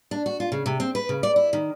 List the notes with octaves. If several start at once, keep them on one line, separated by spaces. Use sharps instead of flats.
D4
F#4
F4
C#3
C3
C4
B4
C#3
D5
E4
D#3